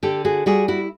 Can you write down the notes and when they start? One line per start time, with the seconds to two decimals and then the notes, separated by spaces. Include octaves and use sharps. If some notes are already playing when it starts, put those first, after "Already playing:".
0.03 D3 G4 A4
0.25 F#4 G#4
0.46 G3 F#4 G#4
0.68 E4 F#4